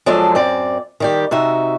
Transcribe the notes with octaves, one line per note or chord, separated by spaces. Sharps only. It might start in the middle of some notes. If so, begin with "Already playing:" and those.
F3 F#3 G#3 D4 A4
F#2 C4 D5
D#3 G3 G4
C3 D#4 F#4 E5